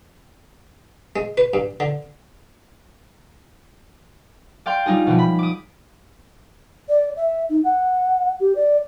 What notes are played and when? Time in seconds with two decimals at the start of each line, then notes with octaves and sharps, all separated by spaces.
1.16 G#3
1.38 B4
1.54 G2
1.80 D3
4.66 D5 F5 G5 C6
4.86 G3 G#3 D#4 F4 G#4
5.07 B2 E3 F3
5.19 B5
5.39 D6 D#6
6.89 D5
7.16 E5
7.49 D#4
7.64 F#5
8.40 G4
8.55 D5